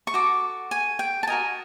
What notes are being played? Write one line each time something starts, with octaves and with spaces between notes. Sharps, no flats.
C#6
F#4 A4 D6
G#5
G5
A5
F#4 A#4 D#5 G#5